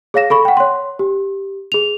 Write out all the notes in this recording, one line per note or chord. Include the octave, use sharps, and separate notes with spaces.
G#4 C#5 F5 A#6 E7
A4 B5 C#6
F#5 G5
C#5 C6
G4
G#4 F7